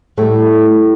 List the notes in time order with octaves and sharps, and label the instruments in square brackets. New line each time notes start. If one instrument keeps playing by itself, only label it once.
[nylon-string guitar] A2 G3 A3